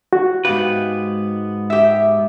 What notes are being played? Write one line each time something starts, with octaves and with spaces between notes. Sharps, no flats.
F#4
G#2 B3 G4 B4 F5
G4 E5